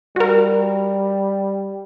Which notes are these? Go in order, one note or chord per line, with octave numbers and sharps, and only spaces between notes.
G3 F#4 A#4